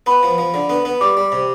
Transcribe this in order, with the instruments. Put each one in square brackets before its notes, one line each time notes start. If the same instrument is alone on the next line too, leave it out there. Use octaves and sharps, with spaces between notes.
[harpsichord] B3 [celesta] B5
[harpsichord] F3
F3
D3
B3
B3
[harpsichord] G3 [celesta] D6
[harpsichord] G3
C3